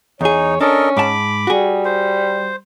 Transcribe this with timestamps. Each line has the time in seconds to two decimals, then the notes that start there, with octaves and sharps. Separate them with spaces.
0.21 E2 D#4 G#4 C#5
0.61 C#4 D4 A4 A#4 D#5
0.97 G#2 A5 B5 D6
1.47 G3 F#4 G#4
1.85 C5